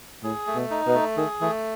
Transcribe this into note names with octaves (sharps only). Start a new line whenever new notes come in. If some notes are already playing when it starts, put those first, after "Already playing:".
A2 G#4
A3
B2
D#4
B2
A3
D#3 G#4
E3 A3